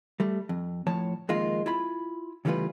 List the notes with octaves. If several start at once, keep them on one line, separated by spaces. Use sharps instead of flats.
G3 A3
F2
A2 F3 C#5 A5
F2 D#3 G#3 A#3 F4
E4 F4 B5
C#3 E3 G3 A3 F4 B4